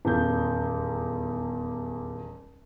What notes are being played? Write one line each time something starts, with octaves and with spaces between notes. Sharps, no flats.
D#1 E2 G6